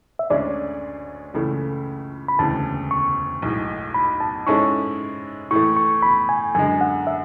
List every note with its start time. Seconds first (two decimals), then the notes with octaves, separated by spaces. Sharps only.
0.19 E5
0.30 D2 D3 G#3 C#4 G#4 D5
1.34 C#2 C#3 E3 A3
2.28 B5
2.39 E1 D2 C#3 E3 A5
2.91 C#6
3.42 B1 A2 G#3
3.95 B5
4.20 A5
4.47 G#2 G#3 C#4 E4 A4 C#6
5.51 A2 E3 A3 C#6
5.77 C#6
6.02 B5
6.29 G#5
6.55 F#2 D3 G#3 G#5
6.81 F#5
7.07 E5